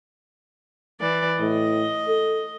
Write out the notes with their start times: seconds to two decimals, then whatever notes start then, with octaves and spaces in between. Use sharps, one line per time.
1.00 E3 D5
1.40 A2 D#5
2.08 A4